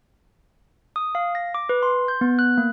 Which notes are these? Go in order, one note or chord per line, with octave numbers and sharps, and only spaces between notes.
D#6
F5
A#6
D6
B4
C6
G6
B3
F#6
A#3